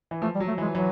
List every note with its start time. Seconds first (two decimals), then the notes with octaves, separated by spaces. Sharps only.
0.11 E3
0.22 F3 A3
0.35 G3
0.40 F#3
0.48 A3
0.58 E3
0.62 G#3
0.75 E3 F#3